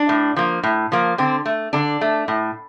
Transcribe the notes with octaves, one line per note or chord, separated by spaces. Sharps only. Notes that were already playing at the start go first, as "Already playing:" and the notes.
Already playing: D4
A2
F3 A#3
A2
F3 A#3
D3 C4
A3
D3 D4
A3
A2